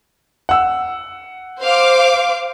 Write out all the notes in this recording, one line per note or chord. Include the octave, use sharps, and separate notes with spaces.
F#5 E6
C5 F5 D6